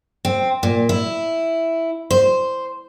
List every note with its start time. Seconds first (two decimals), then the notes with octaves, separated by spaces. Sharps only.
0.25 C4
0.63 A#2
0.89 E4
2.11 C5